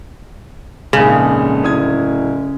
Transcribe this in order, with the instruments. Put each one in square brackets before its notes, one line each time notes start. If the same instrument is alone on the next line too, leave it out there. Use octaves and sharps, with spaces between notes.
[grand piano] A#1 F2 G#2 [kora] C#3 [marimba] G#4
[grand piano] D1 D#6 G#6